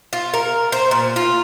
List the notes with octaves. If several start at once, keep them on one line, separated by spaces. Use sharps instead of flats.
F4
A#4
C5
A#2
F4